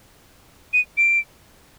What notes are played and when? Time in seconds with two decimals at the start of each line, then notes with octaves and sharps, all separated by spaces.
0.73 D#7
0.97 D7